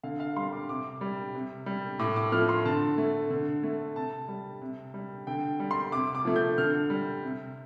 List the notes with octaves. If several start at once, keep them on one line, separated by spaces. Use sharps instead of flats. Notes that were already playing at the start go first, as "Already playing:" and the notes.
D3 F5
F5
G3 C6
D6
C3 D6
G3
C3
G3
A2 D6
D6
F3 A3 F6
C6
D3 A5
A3
D3
A3
C3 A5
G3
C3
G3
D3 G5
G3
C6
C3 D6
D6
F3 A3
G6
D3 F6
G3
C3